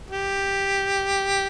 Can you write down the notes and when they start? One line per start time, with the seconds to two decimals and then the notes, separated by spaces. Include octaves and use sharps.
0.11 G4